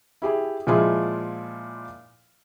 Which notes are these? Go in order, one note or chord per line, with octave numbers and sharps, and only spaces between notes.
E4 G4 G#4
A#2 F3 G#3 E4 F4 G#4